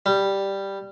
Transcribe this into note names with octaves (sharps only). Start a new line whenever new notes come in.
G3